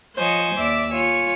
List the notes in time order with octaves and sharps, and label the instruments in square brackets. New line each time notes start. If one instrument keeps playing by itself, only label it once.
[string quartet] F3 C5 C#5 D#5 G#5
D#2 D5 E5 D6 E6
F4 C#5 G#5